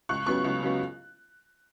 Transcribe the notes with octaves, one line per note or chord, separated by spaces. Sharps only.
C#2 C#6 F#6
C#3 F#3 B3 C#6 F#6
C#2
C#3 F#3 B3